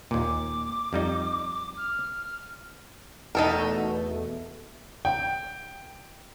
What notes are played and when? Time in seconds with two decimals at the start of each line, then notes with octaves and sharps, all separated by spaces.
0.11 D#2 A#2 D6
0.93 F2 G3 D#4
1.77 F6
3.35 E2 B2 A3 D#4 A4 A#4
5.05 G5